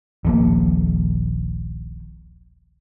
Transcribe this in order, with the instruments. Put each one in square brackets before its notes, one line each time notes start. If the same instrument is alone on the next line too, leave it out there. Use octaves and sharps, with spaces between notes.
[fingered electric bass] D#1 A#1 A#3